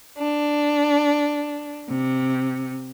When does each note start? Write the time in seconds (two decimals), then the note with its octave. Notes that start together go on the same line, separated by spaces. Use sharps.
0.17 D4
1.88 C3